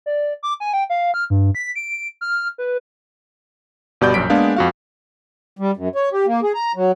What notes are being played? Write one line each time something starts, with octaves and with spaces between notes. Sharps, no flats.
D5
D6
G#5
G5
F5
F6
G2
B6
D7
F6
B4
G1 B2 G3 D5 B5 G6
A#1 F#2 B6 D7
G#3 A#3 B3 D4 G#4 F5
F2 F#4 F5
G3
F#2
C#5
G4
A#3
G#4
A#5
F#3